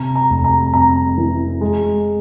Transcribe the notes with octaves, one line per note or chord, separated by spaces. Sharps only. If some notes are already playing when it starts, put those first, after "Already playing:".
Already playing: C3 A#5
A#5
F1
A#5
F2 A#5
E3
G#3